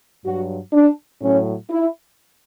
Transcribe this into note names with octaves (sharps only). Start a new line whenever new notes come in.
G2 F#3 F#4
D4
A2 F#3 C#4
E4